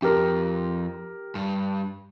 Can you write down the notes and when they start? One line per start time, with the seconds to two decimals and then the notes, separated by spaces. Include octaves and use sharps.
0.02 F2 G4 A#4
1.35 G2